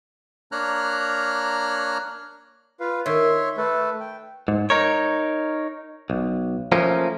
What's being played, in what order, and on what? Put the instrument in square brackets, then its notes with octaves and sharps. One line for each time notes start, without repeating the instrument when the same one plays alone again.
[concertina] A#3 D4 C#5 A#5 F6 F#6
[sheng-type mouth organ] F4 B4 F5
[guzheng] D#3 [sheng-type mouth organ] C#5 E5 C6
[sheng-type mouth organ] A3 A4 B4
G5
[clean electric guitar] G#2
D#4 A#4 C#5
B1
F3 A3 A#3 C#4